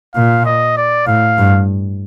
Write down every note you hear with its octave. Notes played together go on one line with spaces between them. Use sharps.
A#2 F5
D#5
D5
A2 F5
G2